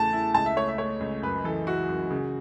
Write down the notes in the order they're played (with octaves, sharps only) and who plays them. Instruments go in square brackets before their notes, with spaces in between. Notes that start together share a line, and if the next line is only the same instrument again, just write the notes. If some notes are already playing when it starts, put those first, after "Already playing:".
Already playing: [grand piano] E2 C#3 A3 E4 [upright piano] A5
[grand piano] E4
[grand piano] C#2 [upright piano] A5
[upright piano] E5
[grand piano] A3 [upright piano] C#5
[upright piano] E5
[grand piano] A3 [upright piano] C#5
[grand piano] C#2
[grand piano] F#2 [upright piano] B4
[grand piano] E3 [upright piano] A4
[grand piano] E4 [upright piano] F#4
[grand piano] F#2
C#3